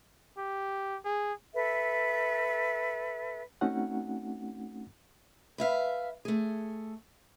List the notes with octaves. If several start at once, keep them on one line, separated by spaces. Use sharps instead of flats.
G4
G#4
A4 B4 E5
A3 C4 C#4 D#4 F#4 F#5
B4 E5 F5
A3 G#4